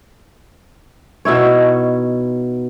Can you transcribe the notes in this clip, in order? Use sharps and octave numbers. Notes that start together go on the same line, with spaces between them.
B2 D#4 E4 C#5